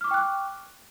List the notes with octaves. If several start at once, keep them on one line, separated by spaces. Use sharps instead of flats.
G5 C#6 D6 F6 F#6